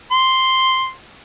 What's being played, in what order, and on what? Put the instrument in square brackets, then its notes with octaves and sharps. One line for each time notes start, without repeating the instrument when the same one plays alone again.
[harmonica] C6